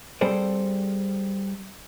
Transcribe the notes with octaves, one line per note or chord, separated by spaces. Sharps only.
G3 C4 G#4 A4 C5 D5